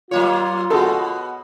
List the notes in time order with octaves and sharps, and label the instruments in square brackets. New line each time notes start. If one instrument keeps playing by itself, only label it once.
[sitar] F#3 A#3 C#5 [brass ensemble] F4
[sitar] B2 B3 [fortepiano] F#4 G#4 A4